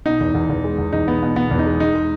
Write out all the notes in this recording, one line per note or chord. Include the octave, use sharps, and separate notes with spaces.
B2 D#4
E2
E2
E2
G#3
E2
E2 D#4
B2 B3
B2
B2 B3
E2
D#4
G#3
G#3 D#4
G#3